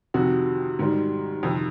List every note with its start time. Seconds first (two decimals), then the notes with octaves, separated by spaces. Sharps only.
0.14 F2 C3 D#3 F#4
0.79 G#2 D#3 G3
1.43 F2 C3 D#3